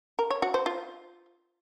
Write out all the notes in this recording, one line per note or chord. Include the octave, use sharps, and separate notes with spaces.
A#4
C#5
F#4
C5
F4